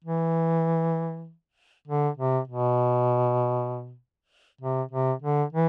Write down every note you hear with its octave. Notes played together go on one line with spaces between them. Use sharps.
E3
D3
C3
B2
C3
C3
D3
E3